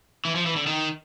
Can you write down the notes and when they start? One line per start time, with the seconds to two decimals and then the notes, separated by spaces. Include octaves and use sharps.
0.25 E3
0.35 F3
0.46 E3
0.56 D3
0.67 D#3